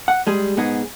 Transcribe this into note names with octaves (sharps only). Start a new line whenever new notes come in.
F#5
G3 G#3 G#4
G#2 B3 D#4 G#4